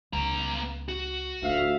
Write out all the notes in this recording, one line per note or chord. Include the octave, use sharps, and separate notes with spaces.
C#2 B3 A#5
F#4
D1 D2 F4 E5 F5